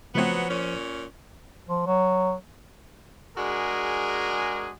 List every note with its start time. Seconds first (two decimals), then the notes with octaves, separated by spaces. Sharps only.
0.15 C#3 F3 F#3 A3 B3 C4 C5
0.49 A#2 C#4
1.68 F3
1.87 F#3
3.37 G#3 D4 F#4 G#4 A#4